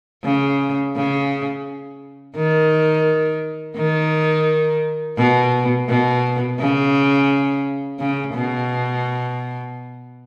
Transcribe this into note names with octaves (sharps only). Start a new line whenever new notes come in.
C#3
C#3
D#3
D#3
B2
B2
C#3
C#3
B2